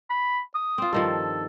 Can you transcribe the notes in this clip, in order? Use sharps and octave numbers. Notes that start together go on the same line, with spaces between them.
B5
D#6
C4 F4
G2 D#3 F3 A4